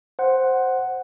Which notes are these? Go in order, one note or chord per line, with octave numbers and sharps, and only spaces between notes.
C5 F#5